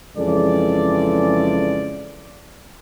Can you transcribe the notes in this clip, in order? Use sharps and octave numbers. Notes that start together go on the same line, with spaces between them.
F2 C#3 E3 G#3 A4 D5